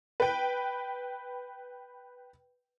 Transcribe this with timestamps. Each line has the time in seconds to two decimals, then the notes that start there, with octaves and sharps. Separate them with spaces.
0.20 B4 G5